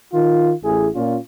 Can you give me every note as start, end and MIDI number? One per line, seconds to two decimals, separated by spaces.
0.13 0.52 51
0.13 0.52 65
0.64 0.88 33
0.64 0.88 64
0.64 0.88 68
0.95 1.16 46
0.95 1.16 61
0.95 1.16 65